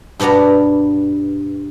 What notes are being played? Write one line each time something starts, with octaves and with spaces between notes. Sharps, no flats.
G2 B2 B3 D4 A#5